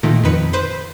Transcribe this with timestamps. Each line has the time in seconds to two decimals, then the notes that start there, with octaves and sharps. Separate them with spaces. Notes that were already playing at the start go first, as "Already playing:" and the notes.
0.03 A#2 D#3 A3
0.24 F2 D#3 B4 C#7
0.53 B4 C5 C6